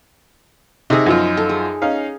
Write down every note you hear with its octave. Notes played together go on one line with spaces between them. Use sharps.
C3 D#4 G#4 A#4
F#2 F3 F4
A4
G#4
C#4 D#4 F5